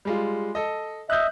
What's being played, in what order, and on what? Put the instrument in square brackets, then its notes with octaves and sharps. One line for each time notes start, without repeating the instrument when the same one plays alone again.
[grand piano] G3 G#3 F4
A4 D#5
[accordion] D#5 E5 [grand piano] F#6 G6